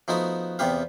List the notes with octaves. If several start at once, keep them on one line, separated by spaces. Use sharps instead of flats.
F3 A3 B3 D#4 F#4 B4
E2 C3 B3 G4 B4 F5